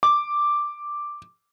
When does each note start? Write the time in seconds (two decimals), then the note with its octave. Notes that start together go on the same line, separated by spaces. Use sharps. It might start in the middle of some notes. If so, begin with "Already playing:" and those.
0.03 D6